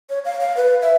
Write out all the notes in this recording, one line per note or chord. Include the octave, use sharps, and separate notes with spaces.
C#5
F5
F5
B4
E5